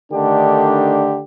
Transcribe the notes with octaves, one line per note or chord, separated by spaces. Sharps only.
D3 D#3 A3 D4 D#4 G4